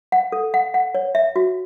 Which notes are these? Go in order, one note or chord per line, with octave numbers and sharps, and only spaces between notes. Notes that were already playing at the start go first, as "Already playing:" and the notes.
F#5
A4
F#5
F#5
C#5
E5
F#4